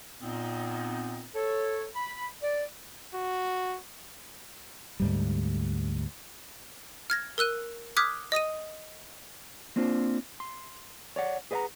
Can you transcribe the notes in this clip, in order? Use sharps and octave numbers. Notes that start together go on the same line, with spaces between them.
A#2 B3 C4 D#4
A4 C#5
B5
D5
F#4
D2 G#2 G3
F6 G#6 A#6
A#4 E6 F#6 D#7
D6 D#6 F6 F#6 G#6 B6
D#5 D#6 A#6 D#7
A#3 C4 D4 F4 C5
C6
C#5 D5 F#5
G#4 B4 D#5 E5 F#5 A#5